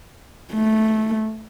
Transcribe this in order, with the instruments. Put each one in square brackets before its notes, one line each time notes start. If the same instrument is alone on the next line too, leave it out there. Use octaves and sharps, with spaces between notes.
[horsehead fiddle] A3